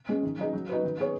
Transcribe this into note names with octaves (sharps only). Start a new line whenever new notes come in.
G#3 C#4 G#4
D#3
F#3 D#4 G#4
F#3
D#4 F#4 B4
D#3
B3 G#4 C#5